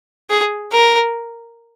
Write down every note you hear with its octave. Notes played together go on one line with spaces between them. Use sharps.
G#4
A#4